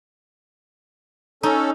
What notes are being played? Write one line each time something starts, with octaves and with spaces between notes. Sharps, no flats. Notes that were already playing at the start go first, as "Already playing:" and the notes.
C#4 D#4 A4